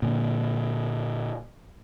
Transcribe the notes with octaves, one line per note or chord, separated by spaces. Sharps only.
A#2 D3